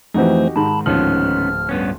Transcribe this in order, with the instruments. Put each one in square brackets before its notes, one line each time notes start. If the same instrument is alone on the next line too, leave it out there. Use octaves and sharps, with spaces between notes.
[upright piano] F2 E3 [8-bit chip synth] A3 C5 [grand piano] D#4 F#4 G4
[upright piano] G#2 D#3 [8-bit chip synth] A5 B5
[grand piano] D1 F3 F#7 [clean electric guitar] B3 C#4 D#4 [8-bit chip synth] F6
[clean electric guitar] G2 B3 C#4